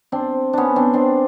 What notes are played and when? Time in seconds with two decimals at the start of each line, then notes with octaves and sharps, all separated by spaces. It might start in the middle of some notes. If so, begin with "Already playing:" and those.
0.12 C4 D4
0.53 B3 C#4 D4
0.76 C4 D4
0.94 C4 D4